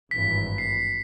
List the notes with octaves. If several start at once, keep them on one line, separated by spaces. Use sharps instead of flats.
G#1 G2 E3 B6
C7